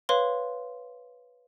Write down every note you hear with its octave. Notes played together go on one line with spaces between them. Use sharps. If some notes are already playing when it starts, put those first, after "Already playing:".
B4 C#5 F5 C6